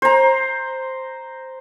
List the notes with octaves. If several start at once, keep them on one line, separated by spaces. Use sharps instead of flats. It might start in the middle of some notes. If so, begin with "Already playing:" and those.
C5 A#5